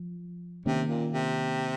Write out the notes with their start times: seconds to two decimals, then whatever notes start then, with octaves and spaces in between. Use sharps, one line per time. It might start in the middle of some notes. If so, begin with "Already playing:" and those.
Already playing: F3
0.66 C3 D#3 A#3 C#4
0.89 A#2
1.12 C3